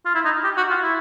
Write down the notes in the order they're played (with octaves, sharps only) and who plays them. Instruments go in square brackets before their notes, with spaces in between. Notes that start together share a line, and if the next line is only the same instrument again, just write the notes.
[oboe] F4
E4
D#4
G4
F#4
F4
E4